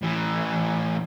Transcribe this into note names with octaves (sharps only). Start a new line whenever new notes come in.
A2 E3